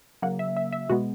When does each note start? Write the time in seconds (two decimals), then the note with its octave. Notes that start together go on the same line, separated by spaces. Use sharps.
0.22 C#3 F#3 A#3 F#5
0.39 E5
0.57 E5
0.72 E5
0.89 B2 G#3 B3 F#4